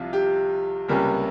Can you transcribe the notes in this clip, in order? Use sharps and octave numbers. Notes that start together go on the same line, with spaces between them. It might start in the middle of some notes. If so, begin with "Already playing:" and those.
Already playing: C2 C3 F3 F4
G4
C#2 C3 G3 A#3 C#4